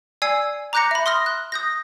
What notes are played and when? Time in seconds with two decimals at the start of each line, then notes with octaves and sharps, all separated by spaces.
0.22 D5 G#5 E6 G#6 C7
0.73 A#5 D6 F#6 G6 A#6 C#7
0.91 E5 B5
1.06 C6 D#6 F6 A#6
1.26 F#6
1.52 D#6 G6 A#6